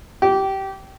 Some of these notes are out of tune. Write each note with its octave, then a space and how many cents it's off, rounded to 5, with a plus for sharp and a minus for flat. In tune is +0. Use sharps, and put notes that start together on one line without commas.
G4 -20